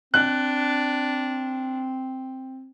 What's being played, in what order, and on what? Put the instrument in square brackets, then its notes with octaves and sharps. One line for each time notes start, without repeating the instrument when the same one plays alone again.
[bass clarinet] C4 [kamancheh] D4 [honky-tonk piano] F#6